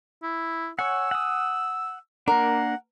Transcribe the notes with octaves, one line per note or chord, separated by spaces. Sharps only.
E4
C#5 F#5 G#5 E6
F#5 D#6
A#3 D4 A#4 F#5